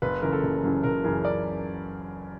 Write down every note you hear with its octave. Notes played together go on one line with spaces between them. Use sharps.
F#1 B4
F#2 C#3 E3 A#4
A4
F#1
F#2 C#3 E3
F#1 A#4
F#2 C#3 E3 A#4
D5